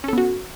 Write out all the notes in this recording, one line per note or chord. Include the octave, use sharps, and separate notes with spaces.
B3 C#4 F#4 A4